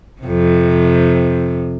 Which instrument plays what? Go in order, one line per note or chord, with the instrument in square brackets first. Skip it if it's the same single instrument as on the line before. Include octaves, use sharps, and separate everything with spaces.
[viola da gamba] F2 C3